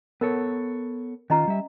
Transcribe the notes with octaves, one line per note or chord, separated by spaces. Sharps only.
B3 A4 A#4 C#5
D#3 C#4 F4 D#5 A#5
G3 E5